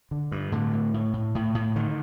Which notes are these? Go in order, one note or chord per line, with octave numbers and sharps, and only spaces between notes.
D3
G2
A2 D3
A2
A2
A2
A2
A2
D3 D#3